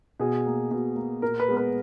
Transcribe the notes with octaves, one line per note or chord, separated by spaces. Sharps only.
B2 G#4
A#3
B2
A#3
A#2 A#4
B4
G#3 B3
B4